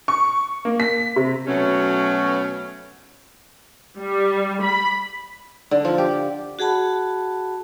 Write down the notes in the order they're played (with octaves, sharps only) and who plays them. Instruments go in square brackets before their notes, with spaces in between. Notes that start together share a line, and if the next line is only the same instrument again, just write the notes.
[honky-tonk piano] C#6
A#3
B6
C3
[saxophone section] B2 F#3 A3 C#4
[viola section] G3
B5
[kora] D3
F3
G4
[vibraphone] F#4 G#4 F#5 A5 B5